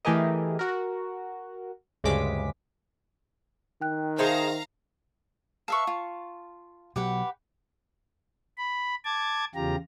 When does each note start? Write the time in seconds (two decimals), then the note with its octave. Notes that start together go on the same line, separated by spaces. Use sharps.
0.05 E3 A3 G4 G#4 A#4 D#5
0.59 F#4 A#4
2.04 D2 G2 C#3 G#3 D6 B6
3.81 D#3 G5 F#6
4.18 D#4 G#4 C5 E5 F5 A5 A#5 C6
5.68 B4 E5 F5 A5 C#6
5.87 F4
6.96 B2 F#3 G4 B4 F#5
8.58 B5
9.05 A5 D6 G#6
9.55 E2 C#3 F4 G4 A#5